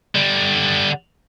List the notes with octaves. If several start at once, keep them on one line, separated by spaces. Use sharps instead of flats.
D3 G3